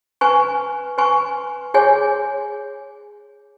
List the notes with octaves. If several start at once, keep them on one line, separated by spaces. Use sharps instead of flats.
B4 G#5 C#6
B4 G#5 C#6
G#4 C#5 G#5